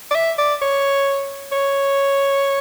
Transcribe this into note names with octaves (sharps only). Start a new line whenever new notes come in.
D5
E5
D5
C#5
C#5